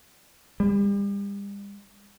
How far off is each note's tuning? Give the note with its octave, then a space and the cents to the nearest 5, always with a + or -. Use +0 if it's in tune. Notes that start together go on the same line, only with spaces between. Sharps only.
G3 +40